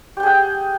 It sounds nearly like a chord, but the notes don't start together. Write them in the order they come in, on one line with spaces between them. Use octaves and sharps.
G4 G5 G#4 F#5